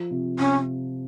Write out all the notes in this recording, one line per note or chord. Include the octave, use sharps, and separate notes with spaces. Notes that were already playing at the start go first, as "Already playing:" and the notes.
Already playing: F3
C3
C3 C#4